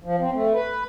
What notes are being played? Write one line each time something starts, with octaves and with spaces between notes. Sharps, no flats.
F3
C4
A3
B4